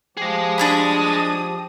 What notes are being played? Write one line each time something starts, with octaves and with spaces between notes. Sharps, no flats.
F3 G4 G#4 D#5
D4 G#5 B5 D#6